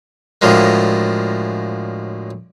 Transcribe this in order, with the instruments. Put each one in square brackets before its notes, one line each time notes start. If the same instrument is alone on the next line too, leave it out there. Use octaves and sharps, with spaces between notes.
[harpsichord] A2 D3 F3 F#3 G#3 A#3